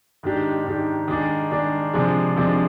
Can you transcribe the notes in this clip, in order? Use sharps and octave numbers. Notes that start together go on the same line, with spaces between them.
G#2 D#3 G#3 D4 G4
G#2 D#3 G#3 D4 G4
D#3 G#3 D4 G#4 D5
D#3 G#3 D4 G#4 D5
C3 F3 G#3 D4 G#4
C3 F3 G#3 D4 G#4